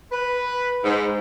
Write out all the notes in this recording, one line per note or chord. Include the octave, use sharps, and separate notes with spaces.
B4
G#2